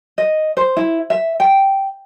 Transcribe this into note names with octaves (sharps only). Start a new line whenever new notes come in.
D#5
C5
E4
E5
G5